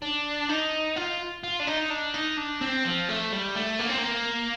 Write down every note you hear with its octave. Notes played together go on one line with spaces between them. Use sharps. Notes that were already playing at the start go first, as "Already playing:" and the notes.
D4
D#4
F4
F4
D4
D#4
D4
D#4
D4
C4
F3
A3
G3
A3
A#3
C4
A#3